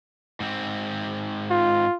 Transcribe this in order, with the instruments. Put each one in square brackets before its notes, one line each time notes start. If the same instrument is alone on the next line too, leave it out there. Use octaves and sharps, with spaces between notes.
[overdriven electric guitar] G#2 C4
[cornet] F4